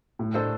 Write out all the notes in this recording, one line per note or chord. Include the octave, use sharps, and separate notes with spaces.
A2
A3 D4 A4 C5